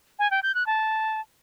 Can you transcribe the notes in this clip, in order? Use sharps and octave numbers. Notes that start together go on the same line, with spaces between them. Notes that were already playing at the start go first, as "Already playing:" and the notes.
G#5
G5
G6
F#6
A5